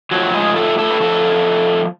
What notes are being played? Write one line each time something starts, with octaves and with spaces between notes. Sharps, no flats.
A2 F3 F#3 F#4
G#3 G#4
A3 A4
A3 A4
B4
A2 F3 A3 A4